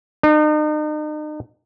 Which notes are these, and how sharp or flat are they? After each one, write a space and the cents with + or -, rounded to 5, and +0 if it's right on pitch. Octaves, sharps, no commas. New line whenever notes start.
D#4 -40